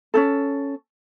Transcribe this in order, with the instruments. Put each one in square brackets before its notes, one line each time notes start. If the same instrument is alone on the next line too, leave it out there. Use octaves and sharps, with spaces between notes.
[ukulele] C#4 D#4 A4